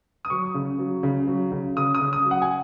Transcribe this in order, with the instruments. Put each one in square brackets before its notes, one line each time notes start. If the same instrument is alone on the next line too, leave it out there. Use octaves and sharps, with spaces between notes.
[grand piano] D#6
F#3 C#6
C#3
F#3
C#3
F#3
C#3
C#3 D#6
D#6
C#3
D#6
F#3
F#5
G#5